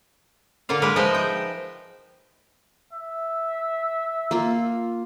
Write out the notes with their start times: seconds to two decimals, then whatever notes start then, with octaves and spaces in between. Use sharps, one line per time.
0.69 D3 A#3 F4 F5
0.82 G#3 A#4 B4
0.96 F3 G#3 D#4 D#5 E5
1.14 G5
2.92 E5
4.31 A#3 F4